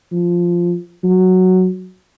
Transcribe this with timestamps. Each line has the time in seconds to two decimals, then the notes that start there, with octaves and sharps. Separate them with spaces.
0.12 F3
1.04 F#3